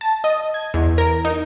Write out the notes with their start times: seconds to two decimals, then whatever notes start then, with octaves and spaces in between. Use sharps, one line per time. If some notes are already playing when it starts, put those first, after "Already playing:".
0.01 A5
0.24 D#5
0.54 G#6
0.74 E2
0.98 A#4
1.25 D#4